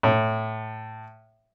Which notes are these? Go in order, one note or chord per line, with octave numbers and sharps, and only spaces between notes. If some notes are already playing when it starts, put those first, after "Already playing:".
A2